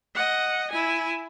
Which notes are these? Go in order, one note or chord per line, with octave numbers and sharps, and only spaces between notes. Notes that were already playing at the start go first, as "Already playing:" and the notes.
D#5 F#5
E4 G#5